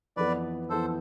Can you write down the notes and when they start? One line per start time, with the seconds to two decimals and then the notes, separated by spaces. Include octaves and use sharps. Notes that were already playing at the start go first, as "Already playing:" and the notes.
0.16 F2 E3 B3 B4 D5
0.69 F2 E3 B3 A4 C5